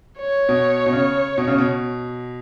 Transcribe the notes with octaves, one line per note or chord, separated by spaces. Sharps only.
C#5
B2
B2
C#3
B2
C#3
B2